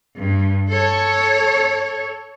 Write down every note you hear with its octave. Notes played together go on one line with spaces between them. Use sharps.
G2
A4 C#5